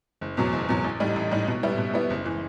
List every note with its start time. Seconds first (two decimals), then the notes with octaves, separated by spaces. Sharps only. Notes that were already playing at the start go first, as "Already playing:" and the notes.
0.21 F#1
0.37 E2 B2 F#3
0.53 F#1
0.69 E2 B2 F#3
0.84 A1
1.00 A2 G3 D#4
1.16 A1
1.31 A2 G3 D#4
1.47 B2
1.63 G3 B3 E4
1.78 B2
1.94 G3 B3 E4
2.10 F#1
2.26 E3